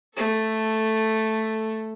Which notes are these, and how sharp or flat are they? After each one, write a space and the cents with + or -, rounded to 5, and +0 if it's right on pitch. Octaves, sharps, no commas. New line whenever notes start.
A3 +0 A4 +5